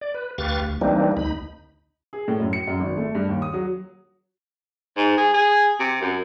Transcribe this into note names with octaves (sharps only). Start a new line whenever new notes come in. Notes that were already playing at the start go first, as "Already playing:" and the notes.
D5
B4
D2 G4 B4 F5 C#6 A6
D2
E3 G3 A#3 C4 D4 D#4
D2 D#4 B5
G#4
A2
F#2
C#7
F#2
G#1
A3
G2
D#2
D#6
F#3
G#2
G#4
G#4
C3
F#2